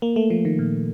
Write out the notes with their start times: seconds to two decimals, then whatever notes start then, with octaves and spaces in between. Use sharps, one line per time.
0.02 A#3
0.16 A3
0.30 F3
0.45 D#3
0.59 A#2